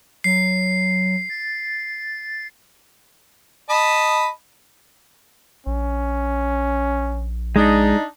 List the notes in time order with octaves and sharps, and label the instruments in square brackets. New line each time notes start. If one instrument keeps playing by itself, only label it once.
[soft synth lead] F#3 [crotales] C7
[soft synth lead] A6
[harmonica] D#5 A5 B5
[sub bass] A#1 [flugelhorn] C#4
[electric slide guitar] G#3 [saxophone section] D4 D#4